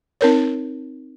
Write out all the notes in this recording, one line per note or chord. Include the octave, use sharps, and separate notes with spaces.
C4 D#4 A#4 C#5